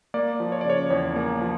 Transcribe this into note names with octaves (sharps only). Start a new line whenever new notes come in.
A#3 D5
F3
C#5
D5
C#3 C#5
E2 C#5
A#3
F3